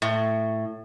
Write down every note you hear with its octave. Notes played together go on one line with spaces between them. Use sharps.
A2